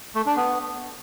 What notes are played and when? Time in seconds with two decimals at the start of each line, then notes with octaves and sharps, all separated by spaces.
0.15 A3
0.26 D4
0.37 B3